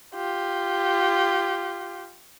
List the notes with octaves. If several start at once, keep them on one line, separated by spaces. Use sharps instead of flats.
F4 G4